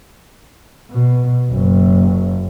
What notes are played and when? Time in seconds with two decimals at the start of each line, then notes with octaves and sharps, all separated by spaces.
0.91 B2
1.51 F#1